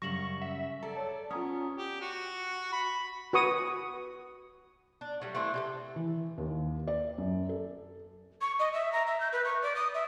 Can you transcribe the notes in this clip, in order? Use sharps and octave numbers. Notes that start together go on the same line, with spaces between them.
F#2 C#3 G3 C#6 A#6 E7 F#7
E5 F#5
G#4 A4 D5 A#5
C#5 A5
B3 C#4 F4 A#5 D#6
G4
F#4
B5
F#4 B4 C#6 D#6
D4
F#3 G3 A3
A3 C4 D4 E4
C3 G4 A4
E3
D#2
D5
F#2
A4
C#6
D#5
E5
A#5
E5
G6
B4
C#6
D5
D#6
E5